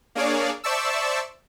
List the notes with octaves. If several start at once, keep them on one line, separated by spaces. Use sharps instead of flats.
A#3 D4 G#4 C#5 D5 F5
C5 D5 E5 A5 C#6 E6